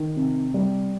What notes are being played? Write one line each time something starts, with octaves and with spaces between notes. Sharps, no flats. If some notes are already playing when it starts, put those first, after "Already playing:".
Already playing: D#3
C3
G3